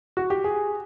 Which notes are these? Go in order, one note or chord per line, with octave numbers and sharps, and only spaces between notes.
F#4
G4
G#4